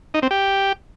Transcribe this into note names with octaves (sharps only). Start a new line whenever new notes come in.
D#4
C4
G4